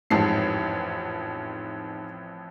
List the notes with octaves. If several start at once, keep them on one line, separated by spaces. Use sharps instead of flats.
A1 F2 G#2 A5 C7